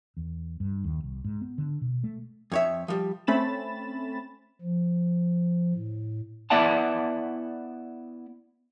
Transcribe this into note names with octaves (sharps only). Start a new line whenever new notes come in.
E2
G2
D#2
C2
G#2
B3
D3
B2
A3
F2 C#5 E5
F3 G3
A3 C4 C#4 B5 A6 E7
F3
A2
B3 E4 D5 E5 F#5 A5